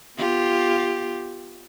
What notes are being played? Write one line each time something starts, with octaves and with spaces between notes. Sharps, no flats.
B3 F4 G4